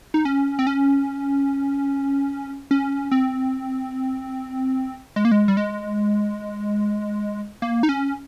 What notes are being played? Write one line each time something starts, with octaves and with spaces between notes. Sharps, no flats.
D#4
C#4
C4
C#4
C#4
C4
G#3
A#3
G#3
G3
G#3
A#3
D#4
C#4